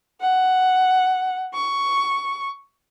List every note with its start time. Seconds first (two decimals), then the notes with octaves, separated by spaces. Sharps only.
0.21 F#5
1.53 C#6